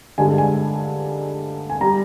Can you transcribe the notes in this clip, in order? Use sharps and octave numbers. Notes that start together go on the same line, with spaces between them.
G2 D3 G#3 G#5
G#5
G#5
G3 A#5